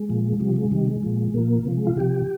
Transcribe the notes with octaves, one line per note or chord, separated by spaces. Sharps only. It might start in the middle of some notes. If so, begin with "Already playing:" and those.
Already playing: G#3
A#2 F3
C3 F3 G3
G#3
C3 D#3 G3
G#3
A#2 F3
A#2 F3 A#3
C3 F3
G#3
F4
C3 F3 G4